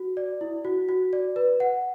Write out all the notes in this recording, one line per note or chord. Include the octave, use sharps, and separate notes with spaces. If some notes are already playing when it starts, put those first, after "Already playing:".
Already playing: F#4
D5
E4
F#4
F#4
D5
B4
F#5